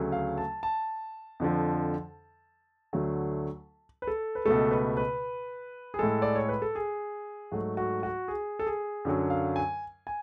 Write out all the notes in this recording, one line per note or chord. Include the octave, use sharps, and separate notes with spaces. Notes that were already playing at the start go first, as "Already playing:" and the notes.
Already playing: D2 C#3 F#3 A3
F5
A5
A5
F2 D3 F3
D2 D3 F#3 A3
B4
A4
B4
C#2 B2 A3 A4
B4
B4
G#4
A2 G#3 A4
D5
C#5
B4
A4
G#4
G#2 F#3 A3 F#4
F#4
F#4
G#4
A4
G#4
F#2 D3 F#3
F5
G#5
G#5